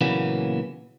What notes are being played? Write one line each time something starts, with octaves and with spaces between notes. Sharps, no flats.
A#2 C#3 E3 F#3 A#3 B3